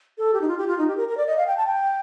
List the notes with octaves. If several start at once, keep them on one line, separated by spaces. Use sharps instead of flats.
A4
G4
D#4
F4
G4
F4
D#4
G4
A#4
A#4
D5
D#5
F5
G5
A5
G5